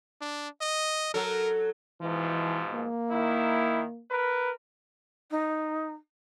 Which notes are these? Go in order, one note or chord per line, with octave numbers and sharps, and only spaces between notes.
D4
D#5
F#3 A4 A#4
G#2 B2 E3 F3
A#3
D#3 E4
A#4 B4
D#4